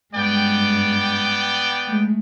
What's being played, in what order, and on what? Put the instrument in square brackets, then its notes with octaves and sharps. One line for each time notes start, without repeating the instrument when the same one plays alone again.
[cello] G2 G#3 [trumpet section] B3 D5 G5
[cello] G#3 A3